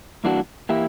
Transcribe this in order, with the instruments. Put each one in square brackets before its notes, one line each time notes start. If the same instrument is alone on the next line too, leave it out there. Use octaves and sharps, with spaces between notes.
[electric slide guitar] G2 E3 A#3 D4 F#4
E3 A#3 E4 G4